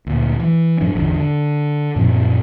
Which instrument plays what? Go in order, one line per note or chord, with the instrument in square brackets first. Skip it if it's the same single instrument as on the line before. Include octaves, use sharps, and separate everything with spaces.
[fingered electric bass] D2 A#2
E3
G2 F3 D4
G#1 E2 D3
D3
F#2 A#2 F3 C4